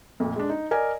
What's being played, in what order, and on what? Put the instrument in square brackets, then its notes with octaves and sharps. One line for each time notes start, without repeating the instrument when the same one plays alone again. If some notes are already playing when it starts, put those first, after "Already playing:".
[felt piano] F2 A#2 A3
G#3 D4
D#4
A#4 D5 D#5 G#5